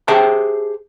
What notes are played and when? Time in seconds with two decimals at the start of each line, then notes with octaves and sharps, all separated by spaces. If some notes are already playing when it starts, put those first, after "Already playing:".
0.08 G4 G#4 C5 E5 G5 A5